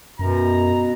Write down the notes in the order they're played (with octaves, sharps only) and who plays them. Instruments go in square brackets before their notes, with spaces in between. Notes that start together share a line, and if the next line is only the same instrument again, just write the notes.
[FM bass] F#2 [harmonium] B2 [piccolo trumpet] A#5